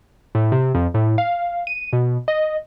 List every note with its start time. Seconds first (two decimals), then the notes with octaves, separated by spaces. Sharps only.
0.35 A2
0.52 C3
0.75 F2
0.94 A2
1.18 F5
1.67 D#7
1.93 B2
2.28 D#5